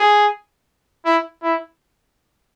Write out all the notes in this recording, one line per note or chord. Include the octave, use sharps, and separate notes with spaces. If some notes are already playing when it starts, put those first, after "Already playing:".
Already playing: G#4
E4
E4